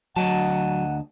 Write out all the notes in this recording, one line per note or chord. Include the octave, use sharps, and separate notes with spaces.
D2 F#3 D#5 F#5 A5